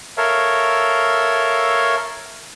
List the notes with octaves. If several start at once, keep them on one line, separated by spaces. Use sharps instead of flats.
A4 A#4 C#5 E5 F5